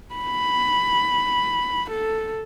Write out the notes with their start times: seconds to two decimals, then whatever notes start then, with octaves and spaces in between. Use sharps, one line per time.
0.15 B5
1.91 A4